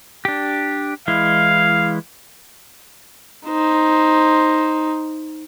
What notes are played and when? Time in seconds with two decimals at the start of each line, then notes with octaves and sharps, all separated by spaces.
0.25 D4 G4
1.08 E3 G#3 E4 F5
3.47 D#4 C5